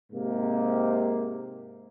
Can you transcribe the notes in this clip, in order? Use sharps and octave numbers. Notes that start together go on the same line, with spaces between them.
G#2 C3 A#3